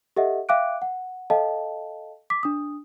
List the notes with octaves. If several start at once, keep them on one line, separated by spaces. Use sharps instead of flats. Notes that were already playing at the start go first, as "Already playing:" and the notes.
G4 A4 D#5 E5 F#5
E5 F5 G5 D6 F#6 D7
F#5
A4 D#5 F5 G5 A5
D6 B6
D4 D#6